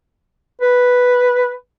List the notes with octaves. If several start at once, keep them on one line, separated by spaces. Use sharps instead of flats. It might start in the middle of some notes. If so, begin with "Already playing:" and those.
B4